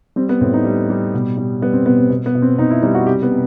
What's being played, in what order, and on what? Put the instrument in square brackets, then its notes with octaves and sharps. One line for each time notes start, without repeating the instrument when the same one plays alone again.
[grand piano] G3 C4
B3
A2 C4
D#4
G3
G3
B2
G3
G3 B3
C4
B2 B3
C4
B2
B3
B2
C4
B2 D#4
E4
G3 D#4
F#4
C3 G4
B3
C3